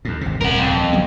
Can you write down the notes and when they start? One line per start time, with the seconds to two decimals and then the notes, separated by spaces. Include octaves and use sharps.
0.05 D#2 A2
0.21 G#1 C3
0.41 D#1 C2 A#4 F#5
0.58 F2
0.93 G1 F#3 B3